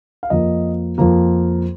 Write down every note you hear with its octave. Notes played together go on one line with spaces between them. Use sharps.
F5
F2 F3 A#3 D#5
F2 F3 A#3